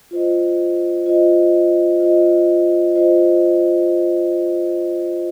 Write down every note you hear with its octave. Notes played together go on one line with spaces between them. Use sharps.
F4 C5 D#5
F4 C5 D#5
F4 C5 D#5
F4 C5 D#5